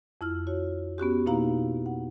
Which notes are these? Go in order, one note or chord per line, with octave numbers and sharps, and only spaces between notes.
F2 E4 F6
F#4 C#5
B3 C#4 F#4 G4
B2 A#3 D#4 E4 F5 A#5
F#5